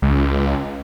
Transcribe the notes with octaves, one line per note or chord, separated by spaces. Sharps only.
C#2